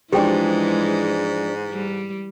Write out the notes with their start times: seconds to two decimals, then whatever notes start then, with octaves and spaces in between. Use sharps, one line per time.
0.13 G#2 E3 F3 G#3 D4 G4 G#4 G5
1.71 G3